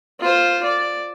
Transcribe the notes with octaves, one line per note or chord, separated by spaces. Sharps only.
F4 C5
D5